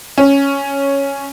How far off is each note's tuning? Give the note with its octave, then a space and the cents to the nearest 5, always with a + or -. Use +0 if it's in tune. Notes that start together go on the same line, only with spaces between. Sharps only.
C#4 +0